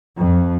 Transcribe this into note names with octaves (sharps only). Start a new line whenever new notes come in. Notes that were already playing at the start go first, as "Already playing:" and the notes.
F2